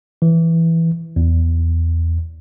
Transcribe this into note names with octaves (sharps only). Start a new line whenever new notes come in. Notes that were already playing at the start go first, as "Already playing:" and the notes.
E3
E2